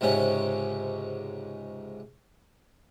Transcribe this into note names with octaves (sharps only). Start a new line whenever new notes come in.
C#2 G#2 C3 C#4